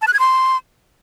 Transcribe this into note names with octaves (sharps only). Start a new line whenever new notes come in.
A5
F#6
G#6
C6